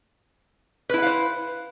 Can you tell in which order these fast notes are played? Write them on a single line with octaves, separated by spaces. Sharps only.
B4 E4 F#5 F5 C5